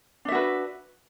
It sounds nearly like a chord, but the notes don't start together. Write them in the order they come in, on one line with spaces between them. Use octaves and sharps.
D4 E5 F#4 B4